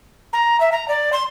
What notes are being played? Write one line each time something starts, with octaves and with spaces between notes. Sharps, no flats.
A#5
E5
A#5
D5
C6